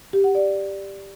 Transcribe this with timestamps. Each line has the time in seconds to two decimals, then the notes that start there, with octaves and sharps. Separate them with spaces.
0.13 G4
0.24 F#5
0.35 D5